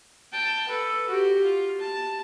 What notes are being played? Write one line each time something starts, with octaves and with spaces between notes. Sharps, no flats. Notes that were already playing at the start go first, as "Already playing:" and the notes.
G5 A5
A4 B4
F#4 G4
F4
A5